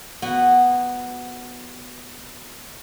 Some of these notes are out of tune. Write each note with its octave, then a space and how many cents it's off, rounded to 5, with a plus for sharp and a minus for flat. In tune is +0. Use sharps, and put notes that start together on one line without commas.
B3 +0 F#4 +0 G#5 -35